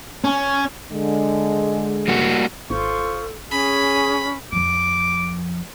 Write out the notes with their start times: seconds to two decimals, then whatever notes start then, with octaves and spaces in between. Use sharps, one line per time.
0.24 C#4
0.91 D3 G#3
2.08 G3 A#3 F#4
2.70 G#1 F4 A4 C5 C#6
3.51 C#4 G#4 B5
4.52 F2 F3 D6